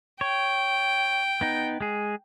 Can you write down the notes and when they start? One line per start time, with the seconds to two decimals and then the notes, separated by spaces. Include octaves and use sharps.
0.21 C#5 G5
1.41 B3 D#4
1.81 G#3 G#4